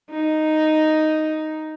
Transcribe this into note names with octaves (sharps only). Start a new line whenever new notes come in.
D#4